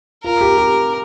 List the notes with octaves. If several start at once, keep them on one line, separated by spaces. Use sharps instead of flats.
F4 A#4
G4
G4